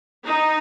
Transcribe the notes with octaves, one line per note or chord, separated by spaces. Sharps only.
D#4